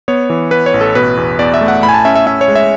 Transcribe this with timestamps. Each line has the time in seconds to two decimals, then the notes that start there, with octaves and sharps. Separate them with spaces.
0.08 B3 C#5
0.30 E3
0.51 B3 B4
0.66 C#5
0.74 A1
0.81 A4
0.95 B2 B4
1.17 E2
1.39 E2 D5
1.54 E5
1.61 A3
1.68 F#5
1.83 A2 B5
1.89 G#5
1.94 A5
2.05 C#4 E5
2.16 E5
2.27 C#4 E5
2.41 C#5
2.48 G#3
2.55 E5